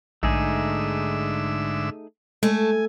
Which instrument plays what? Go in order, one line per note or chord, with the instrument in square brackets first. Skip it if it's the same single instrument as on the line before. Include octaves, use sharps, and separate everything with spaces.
[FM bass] A#1 [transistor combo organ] G#2 D3 E5 [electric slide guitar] A3 D#4 G#4
[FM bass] G#3 [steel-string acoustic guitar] A3 [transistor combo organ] G#5